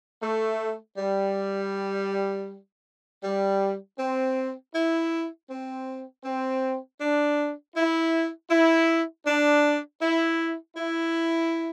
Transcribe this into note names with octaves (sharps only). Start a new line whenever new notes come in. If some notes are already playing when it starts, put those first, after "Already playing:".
A3
G3
G3
C4
E4
C4
C4
D4
E4
E4
D4
E4
E4